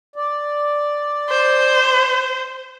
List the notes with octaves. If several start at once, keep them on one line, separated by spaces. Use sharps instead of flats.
D5
C5